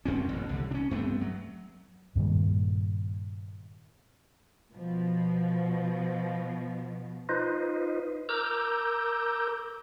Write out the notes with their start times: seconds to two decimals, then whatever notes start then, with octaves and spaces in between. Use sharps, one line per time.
0.05 F#2 C4 C#4
0.29 A1 B2
0.49 C2 D3
0.71 C#4 D4
0.91 G2 A3 B3 C4
1.21 F#3
2.15 G2 A#2 D#3 G3
4.72 B2 F3
7.29 D#4 F4 B4 C5 D#5
8.29 A#4 A#5 D6 E6 G6